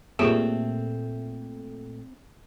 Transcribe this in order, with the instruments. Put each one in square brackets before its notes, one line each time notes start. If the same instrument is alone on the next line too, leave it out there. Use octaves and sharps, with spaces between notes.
[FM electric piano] A#2 A3 [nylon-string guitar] C4 [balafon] F4 G4 G#4